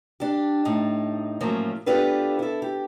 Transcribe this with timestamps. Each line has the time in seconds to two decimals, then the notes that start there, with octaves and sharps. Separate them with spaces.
0.20 D4 G4
0.65 A2 D#4
1.40 A2 F3 F#3 A#3 C#4
1.86 B3 D4 F4 G4 A4 B4
2.39 E4 A4
2.62 G4